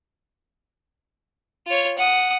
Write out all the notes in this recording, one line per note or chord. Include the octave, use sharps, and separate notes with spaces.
F4 C#5
F#5 D#6